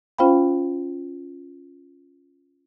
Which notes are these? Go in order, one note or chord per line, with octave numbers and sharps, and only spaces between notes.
C#4 F4 C5 F5 G5 B5